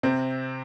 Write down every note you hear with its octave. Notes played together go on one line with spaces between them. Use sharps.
C3 C4